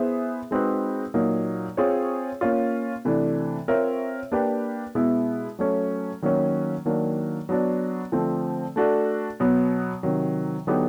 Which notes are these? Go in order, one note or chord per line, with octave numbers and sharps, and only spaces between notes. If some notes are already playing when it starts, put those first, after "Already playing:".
Already playing: B3 E4 G#4 C5 E5
G#3 C4 D#4 F#4 B4
A#2 F#3 A#3 D#4
C4 F4 G#4 C#5
A#3 C#4 F4
C3 E3 A3 D4
C4 F4 A#4 C#5 E5
A#3 D4 G4 B4
B2 G#3 B3 E4
F#3 A3 C#4
D#3 F#3 A#3 C#4
D#3 F#3 A#3 D4
F#3 B3 D4 F#4
D3 F3 A3 C4
A3 D4 F#4 A4
B2 F#3 B3
C3 D#3 F#3
D3 F#3 B3 D#4 G4